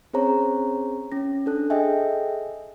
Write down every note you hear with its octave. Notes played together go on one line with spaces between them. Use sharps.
C4 C#4 G#4 C5 C#5 A#5
C#4 A#6
D4 A4 F#6
G#4 A4 D#5 E5 G5 G#5